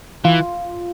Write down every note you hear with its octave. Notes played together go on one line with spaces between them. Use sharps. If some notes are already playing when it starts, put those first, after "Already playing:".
E3 F4